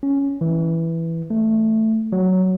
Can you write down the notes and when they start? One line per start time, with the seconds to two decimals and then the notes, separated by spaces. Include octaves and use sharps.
0.03 C#4
0.41 E3
1.30 A3
2.12 F#3